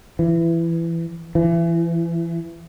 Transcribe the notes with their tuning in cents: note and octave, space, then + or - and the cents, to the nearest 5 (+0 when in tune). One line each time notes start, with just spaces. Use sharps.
E3 +15
E3 +30